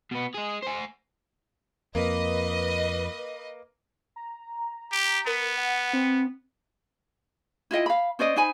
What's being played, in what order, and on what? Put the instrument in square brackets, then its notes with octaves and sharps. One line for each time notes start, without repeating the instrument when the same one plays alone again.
[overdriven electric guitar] B2 B3
G#3 G#4
C5 G#5
[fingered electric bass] F2 [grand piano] A#3 [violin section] B4 D#5
[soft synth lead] A#5
[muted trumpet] G4
[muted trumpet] B3 [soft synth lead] A#4
[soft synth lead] F#5
C4
[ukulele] E4 F4 D#5 G5
F5 B5
C#4 C5 D5 D#5
D#4 C5 G#5 B5